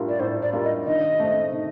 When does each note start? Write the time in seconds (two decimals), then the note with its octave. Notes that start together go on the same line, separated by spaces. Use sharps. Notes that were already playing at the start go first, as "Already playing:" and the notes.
Already playing: A2 G3 D4 F4 A#4
0.09 D5
0.20 A2 C5
0.42 D5
0.53 G3 D4 F4 A#4
0.64 D#5
0.86 D#3 D#5
1.20 A3 C4
1.53 D#3